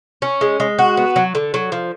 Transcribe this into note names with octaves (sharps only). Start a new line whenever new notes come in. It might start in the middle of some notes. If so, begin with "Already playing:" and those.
C#4
G#3
G#3
F#4
B3
F#3
D3
F#3
F3